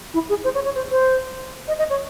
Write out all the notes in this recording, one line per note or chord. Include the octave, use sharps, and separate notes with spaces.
E4
G#4
C5
C#5
C#5
C5
C5
D#5
D#5
C#5